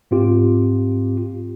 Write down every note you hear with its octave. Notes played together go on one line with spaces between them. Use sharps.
G#2 C4 F4 G4